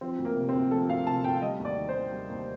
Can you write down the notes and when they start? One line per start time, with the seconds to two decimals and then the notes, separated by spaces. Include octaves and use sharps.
0.01 F3 C4
0.19 D2
0.25 A#3
0.37 C3
0.49 D2 C4
0.71 F3 A4
0.89 D2 F5
1.07 C3 A5
1.24 D2 G5
1.42 G3 D#5
1.59 D#2
1.65 D5
1.76 D#3
1.89 C5
1.94 D#2
2.12 G3
2.30 D#2